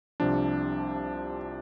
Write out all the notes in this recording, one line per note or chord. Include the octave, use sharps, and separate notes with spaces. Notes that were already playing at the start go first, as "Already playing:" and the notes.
C2 C3 F3 D4